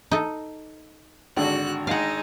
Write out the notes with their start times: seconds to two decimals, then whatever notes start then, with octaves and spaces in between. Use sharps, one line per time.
0.11 D#4 A4
1.36 G#1 D3 F#4 F#6
1.87 G#3 D#4 F5 F#5